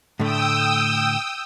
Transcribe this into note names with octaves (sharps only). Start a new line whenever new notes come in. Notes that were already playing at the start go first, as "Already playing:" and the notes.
A2 D3 A3 G5 D#6 E6